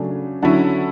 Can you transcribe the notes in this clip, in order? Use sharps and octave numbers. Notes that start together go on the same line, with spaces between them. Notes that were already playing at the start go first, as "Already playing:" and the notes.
Already playing: C#3 F#3 A3 D4 G#5
D3 F#3 C#4 E4 F#5 A5